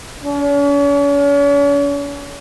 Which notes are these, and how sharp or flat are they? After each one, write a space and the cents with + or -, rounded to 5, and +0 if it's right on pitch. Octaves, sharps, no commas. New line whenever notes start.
C#4 +45